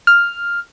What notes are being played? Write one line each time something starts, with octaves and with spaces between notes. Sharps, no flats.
F6